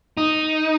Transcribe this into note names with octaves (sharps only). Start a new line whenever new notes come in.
D#4